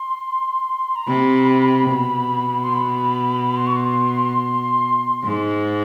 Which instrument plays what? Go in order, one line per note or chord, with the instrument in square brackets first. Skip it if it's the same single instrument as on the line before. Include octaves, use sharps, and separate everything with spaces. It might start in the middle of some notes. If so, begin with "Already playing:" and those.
Already playing: [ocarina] C6
A#5
[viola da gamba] C3 [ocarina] B5
[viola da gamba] B2
[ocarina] C6
B5
C6
C#6
C6
[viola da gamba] G#2